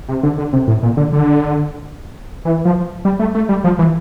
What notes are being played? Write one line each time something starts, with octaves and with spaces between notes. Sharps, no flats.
C3
D3
D3
C3
A2
A#2
D3
D3
E3
F3
G3
A3
A3
G3
F3
E3